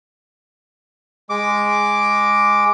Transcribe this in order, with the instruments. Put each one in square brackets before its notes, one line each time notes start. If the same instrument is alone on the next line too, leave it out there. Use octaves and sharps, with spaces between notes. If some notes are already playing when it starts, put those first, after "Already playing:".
[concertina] G#3 D6